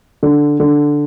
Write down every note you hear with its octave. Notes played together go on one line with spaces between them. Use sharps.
D3
D3